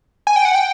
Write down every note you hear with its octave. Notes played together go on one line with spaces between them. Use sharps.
G#5
G5
F#5
G5